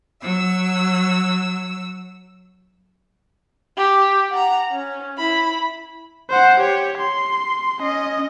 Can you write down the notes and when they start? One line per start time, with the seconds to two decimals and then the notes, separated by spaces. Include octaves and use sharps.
0.21 F#3 E6
3.77 G4
4.30 F#5 A#5
4.72 C#4
5.18 E4 B5
6.30 C5 F#5
6.60 G4 C#5
6.98 C6
7.81 C#4 D#5